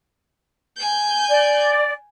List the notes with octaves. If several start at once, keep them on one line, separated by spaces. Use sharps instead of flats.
G#5 G6
D5